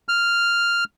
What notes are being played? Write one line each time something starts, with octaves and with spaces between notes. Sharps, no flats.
F6